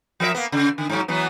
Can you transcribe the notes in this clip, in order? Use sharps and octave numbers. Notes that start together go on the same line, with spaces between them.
F3 A#4 E5
A#3 B3
C#3
D3
G#2 F#3
E3 F#3 B3